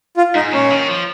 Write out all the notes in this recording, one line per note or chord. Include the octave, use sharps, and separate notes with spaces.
F4
G#2 D#4
A#2 C#4
D#3
F3